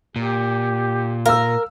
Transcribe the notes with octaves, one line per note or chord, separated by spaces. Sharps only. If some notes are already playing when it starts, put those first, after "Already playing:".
A#2 G4
A#4 F5 E6